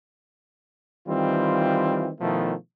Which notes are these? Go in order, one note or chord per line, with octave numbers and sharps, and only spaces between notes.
D#3 E3 G3 C4 F4
B2 D#3 F3 A3 B3 E4